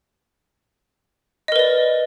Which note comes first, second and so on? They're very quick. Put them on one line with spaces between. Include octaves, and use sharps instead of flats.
D#5 A#4 B4 D5